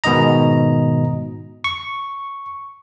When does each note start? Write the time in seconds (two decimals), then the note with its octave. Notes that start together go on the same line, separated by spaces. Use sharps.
0.04 G#2 B2 D#3 D#5 A#5
1.64 C#6